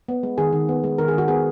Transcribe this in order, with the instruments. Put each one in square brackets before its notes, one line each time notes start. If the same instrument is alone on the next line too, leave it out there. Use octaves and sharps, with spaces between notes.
[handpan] B3
G#3
D#3 G#4
D#3
B3
G#3
D#3 A#4
G#4
D#3 F#4
B3 G#4